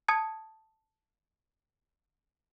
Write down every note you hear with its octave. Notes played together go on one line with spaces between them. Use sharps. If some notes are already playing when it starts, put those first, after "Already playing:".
A5 D#6 G#6 C#7